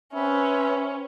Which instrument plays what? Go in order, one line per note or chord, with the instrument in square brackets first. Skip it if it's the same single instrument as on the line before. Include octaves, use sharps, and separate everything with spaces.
[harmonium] C4 B4 E5 [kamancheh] C#4